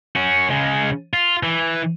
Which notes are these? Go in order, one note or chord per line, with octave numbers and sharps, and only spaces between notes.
C#4 F#4
C#3 G#3
F4
E3